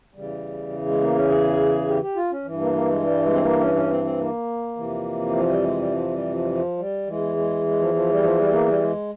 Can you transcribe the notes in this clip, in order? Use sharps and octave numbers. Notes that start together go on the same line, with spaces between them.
E2 C#3 E3 G3
G#3
A#3
C#4
G#4
G4
G4
F4
C#4
G2 E3
A#3
A#3
G#3
G3
G#3
C4
A#3
C#4
C#4
C4
C4
A#3
F2 C3 E3
F3
G3
G#3
G3
F3
G3
F3
G3
F3
G3
E2 E3 G#3
G#3
G#3
F3
F3
G3
F3
G3
A#3
G3
G#3